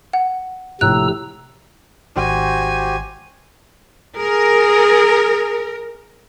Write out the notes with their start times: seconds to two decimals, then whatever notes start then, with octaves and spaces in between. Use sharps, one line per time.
0.13 F#5
0.81 A#1 A2 C3 A#5 E6 F#6
2.17 G#1 F#4 G4 C5 G#5
4.18 G#4 A#4